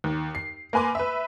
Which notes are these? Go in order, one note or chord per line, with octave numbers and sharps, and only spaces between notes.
D#2
C7
A#3 B4 G#5 C6 D6
B4 E5